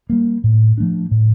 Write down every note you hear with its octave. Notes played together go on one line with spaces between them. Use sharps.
G3 A#3
A2
F3 A3 D4
A2